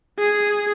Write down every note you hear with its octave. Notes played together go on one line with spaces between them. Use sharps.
G#4